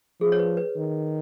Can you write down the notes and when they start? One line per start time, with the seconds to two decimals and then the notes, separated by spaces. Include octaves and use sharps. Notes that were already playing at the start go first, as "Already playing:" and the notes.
0.21 F3 G#4
0.32 C#5
0.39 B4
0.57 B4
0.76 D#3